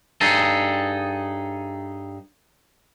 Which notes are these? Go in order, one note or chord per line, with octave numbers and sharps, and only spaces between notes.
G2 D#4 G#4 A4